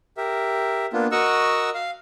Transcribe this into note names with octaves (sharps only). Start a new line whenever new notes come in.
G4 A#4 E5
A#3 B3 D4 F4
F#4 A#4 D#5 F#5 C#6 E6
F5